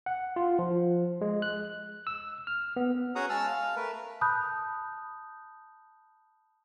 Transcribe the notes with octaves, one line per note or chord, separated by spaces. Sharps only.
F#5
F4
F3
G#3
F#6
E6
F6
B3
C#4 F#4 G#4 F#5 A#5 D#6
G#3 A5 E6 F6
F5
A3 A#4 B4
A5 B5 D#6 F#6 G6